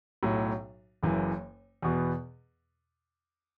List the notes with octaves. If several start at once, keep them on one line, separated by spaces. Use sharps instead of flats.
B1 A2 F#3
F#1 F#2 E3
E2 B2 B3